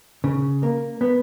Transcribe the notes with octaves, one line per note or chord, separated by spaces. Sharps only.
C#3
A#3
B3